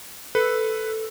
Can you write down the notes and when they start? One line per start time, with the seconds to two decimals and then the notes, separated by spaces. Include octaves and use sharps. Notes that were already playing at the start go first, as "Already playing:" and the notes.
0.35 A4 B4